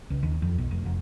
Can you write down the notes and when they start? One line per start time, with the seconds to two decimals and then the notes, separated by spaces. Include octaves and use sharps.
0.10 C#2
0.23 D#2
0.42 F2
0.58 B1
0.71 F1
0.86 F1